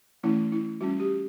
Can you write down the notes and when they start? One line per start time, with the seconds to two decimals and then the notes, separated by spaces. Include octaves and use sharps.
0.23 E3 A3 C#4 E4
0.52 E4
0.81 G3 C#4 F#4
1.00 G4